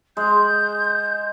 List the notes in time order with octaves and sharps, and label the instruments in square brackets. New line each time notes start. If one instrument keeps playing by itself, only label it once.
[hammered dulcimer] G#3 [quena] G6